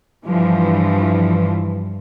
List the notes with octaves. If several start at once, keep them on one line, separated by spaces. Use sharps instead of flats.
G2 E3 F3